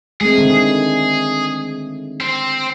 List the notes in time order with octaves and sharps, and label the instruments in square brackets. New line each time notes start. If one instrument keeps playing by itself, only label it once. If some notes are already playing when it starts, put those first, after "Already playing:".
[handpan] G#3 A3 C4 [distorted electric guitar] G#4
[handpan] D3 D#3
[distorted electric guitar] C4